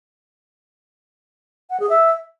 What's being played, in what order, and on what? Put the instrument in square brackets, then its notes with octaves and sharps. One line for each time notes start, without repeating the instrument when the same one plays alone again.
[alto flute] F#5
G#4
E5